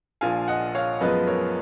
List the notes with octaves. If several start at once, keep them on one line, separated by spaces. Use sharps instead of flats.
A#1 A#2 F3 F5 G#5
D#5 F#5
C#5 F5
F#2 F3 G#3 B3 B4 D#5
A#4 C#5